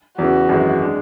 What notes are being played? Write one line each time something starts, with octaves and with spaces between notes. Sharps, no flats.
E2 C#3 E3 F#4
G#1 F#2 E3 G#3
G#3 D4